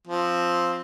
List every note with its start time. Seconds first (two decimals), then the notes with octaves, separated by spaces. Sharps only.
0.07 F3 C4